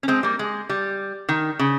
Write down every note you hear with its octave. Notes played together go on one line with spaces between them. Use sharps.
C#4
G#3 C4
G3 A#3
G#3
G3
D#3
C#3